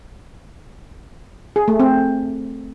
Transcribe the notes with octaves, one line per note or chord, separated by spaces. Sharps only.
G#4
A3
C4